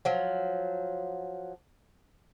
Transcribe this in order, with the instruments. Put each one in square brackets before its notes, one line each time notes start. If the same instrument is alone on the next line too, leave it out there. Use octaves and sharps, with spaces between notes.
[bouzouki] F3 F#3